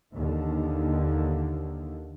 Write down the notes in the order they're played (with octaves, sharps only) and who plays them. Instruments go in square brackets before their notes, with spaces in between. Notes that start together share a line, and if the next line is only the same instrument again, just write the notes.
[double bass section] D#2 D3 D#3